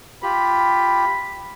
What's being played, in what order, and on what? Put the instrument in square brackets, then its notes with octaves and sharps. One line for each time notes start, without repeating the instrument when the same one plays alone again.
[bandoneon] F4 G4 [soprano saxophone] B5